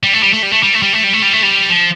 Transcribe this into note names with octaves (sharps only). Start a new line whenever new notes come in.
G3
A3
G3
A3
G3
A3
G3
A3
G3
A3
G3
A3
G3
A3
G3
F3